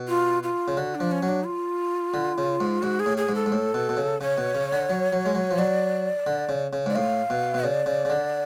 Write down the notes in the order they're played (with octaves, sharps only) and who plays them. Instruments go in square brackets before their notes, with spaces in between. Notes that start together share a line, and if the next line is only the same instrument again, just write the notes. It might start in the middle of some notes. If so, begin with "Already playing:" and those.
Already playing: [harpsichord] B2
[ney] F4
F4
[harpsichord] C#3
[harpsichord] D3 [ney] F#4
[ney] D4
[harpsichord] F3
[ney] C#4
[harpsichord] F#3
[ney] D4
F4
[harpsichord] D3
C#3
G#2
[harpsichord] G#2 [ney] F#4
[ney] G#4
[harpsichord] A2
[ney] G#4
[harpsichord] G#2
[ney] A4
[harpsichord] G#2
A2
B2
B2
C#3
[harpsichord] C#3 [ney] C#5
[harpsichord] B2
C#3
D3
F#3
F#3
G#3
F#3
F3
[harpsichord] F#3 [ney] D5
[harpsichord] D3
C#3
C#3
[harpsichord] G#2 [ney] D5
[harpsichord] A2 [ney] F5
[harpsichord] B2
B2
[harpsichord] C#3 [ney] D5
[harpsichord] C#3
C#3
D3